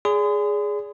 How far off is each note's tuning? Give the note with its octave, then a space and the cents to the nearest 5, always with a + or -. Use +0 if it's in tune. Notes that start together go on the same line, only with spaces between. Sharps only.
G#4 +0 D5 -30 C6 -45